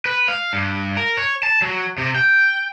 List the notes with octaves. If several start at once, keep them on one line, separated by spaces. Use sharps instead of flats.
B4
F5
G2
A#4
C#5
A5
F#3
C3
G5